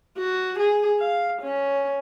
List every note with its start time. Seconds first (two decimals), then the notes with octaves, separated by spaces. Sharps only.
0.18 F#4
0.59 G#4
1.00 F5
1.42 C#4